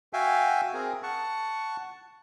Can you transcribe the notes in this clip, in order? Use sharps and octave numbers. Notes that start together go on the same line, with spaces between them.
F#4 E5 F5 G5 G#5
C4 G#4 A#4
F#5 A5 C#6